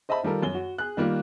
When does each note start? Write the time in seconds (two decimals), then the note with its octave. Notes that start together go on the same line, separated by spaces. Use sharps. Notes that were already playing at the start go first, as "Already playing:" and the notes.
0.09 C5 D#5 E5 A5 B5
0.23 D#3 G3 F4 A4 A#4
0.43 F#2 G7
0.55 F#4
0.78 G#4 F#6
0.97 D#3 G3 A#3 F4